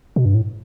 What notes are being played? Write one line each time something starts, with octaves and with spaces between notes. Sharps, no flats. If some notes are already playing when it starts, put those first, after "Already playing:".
B2
G2
A2